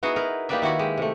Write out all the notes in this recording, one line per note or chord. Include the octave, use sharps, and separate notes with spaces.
B3 D#4 E4 F#4 G#4
A#4 B4
A#3 D#4 G4 B4 D5 E5
D#3 E4 F#4
G#3 G4
C3 A3